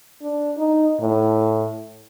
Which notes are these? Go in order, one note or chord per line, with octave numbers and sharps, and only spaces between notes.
D4
D#4
A2